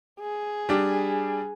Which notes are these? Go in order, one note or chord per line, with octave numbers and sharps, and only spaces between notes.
G#4
G3 D4